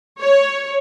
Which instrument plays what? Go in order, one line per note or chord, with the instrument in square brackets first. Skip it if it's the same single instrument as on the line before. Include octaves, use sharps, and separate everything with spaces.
[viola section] C#5